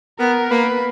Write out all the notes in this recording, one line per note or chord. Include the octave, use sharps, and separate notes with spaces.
B3 A#4
A#3 B4